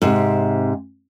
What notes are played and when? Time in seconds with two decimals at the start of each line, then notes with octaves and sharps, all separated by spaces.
0.02 G#2 C3